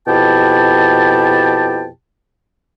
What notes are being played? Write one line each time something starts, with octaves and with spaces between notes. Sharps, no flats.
F2 B2 E4 G4 G5 A5